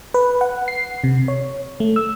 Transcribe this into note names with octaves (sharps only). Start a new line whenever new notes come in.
B4
F#5
C7
C3
C#5
A3
E6